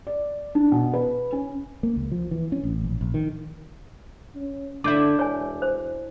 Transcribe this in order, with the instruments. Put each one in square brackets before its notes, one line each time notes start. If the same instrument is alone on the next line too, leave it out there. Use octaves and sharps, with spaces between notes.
[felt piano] D5
D4
B2
B4
C#4
[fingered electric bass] A#3
C#2
F3
E3
C#4
A1
A#1
A#1
D#3
[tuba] C#4
[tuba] D3 [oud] D4 E4 [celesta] D6 G6
[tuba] E1 [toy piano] C#5 G#5
[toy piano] C5